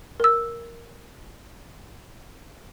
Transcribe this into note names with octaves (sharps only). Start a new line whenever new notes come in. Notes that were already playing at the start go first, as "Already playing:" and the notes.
A#4 E6